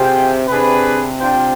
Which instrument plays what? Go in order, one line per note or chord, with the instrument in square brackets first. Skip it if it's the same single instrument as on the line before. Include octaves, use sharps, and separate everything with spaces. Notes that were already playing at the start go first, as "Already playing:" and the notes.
Already playing: [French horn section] C3 [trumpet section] F4 G#4 C5 G5
[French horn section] C3 [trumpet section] D4 G#4 B4
[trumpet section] D4 F4 C5 G5